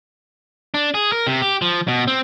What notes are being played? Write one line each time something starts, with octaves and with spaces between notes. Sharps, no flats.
D4
G#4
A#4
C3
G4
F3
B2
C4